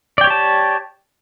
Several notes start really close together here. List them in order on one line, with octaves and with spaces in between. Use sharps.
D5 G5 C#5 G4 A5